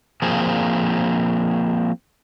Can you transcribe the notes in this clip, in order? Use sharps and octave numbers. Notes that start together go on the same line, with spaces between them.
F3 A#3 C4 G#4